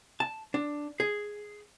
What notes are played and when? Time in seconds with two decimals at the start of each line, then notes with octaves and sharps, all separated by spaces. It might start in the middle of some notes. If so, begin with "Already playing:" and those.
0.20 A5
0.54 D4
1.00 G#4